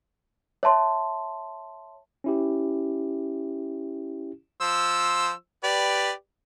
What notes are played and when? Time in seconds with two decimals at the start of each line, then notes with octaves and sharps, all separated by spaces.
0.63 C#5 E5 A5 C6
2.24 C#4 E4 G4
4.61 F3 C5 E6
5.64 G4 B4 D5